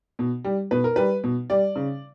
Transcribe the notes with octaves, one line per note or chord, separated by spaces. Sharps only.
B2
G3
B2 B4
A#4
G3 B4
B2
G3 D5
C#3